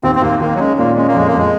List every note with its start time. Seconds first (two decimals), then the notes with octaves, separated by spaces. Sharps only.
0.04 D#2 C4
0.15 C4
0.22 D#2 A#3
0.40 D#3 A#3
0.55 F#3
0.59 G#3 C#4
0.78 A#2 A#3
0.96 G#3 C#4
1.07 A#3
1.15 F2 G#3
1.27 A#3
1.34 F2 G#3